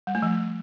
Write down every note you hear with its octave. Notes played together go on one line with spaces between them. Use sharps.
G3
A3
F3